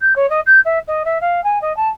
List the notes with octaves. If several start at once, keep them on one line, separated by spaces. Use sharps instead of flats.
G6
C#5
D#5
G6
E5
D#5
E5
F5
G#5
D#5
A5